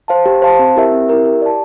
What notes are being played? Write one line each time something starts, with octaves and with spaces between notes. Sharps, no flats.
C5 F5 A5
G4
C5 F5 A5
C4
E4 G4 A#4 E5
C4
E4 G4 A#4 E5
G4
D5 A5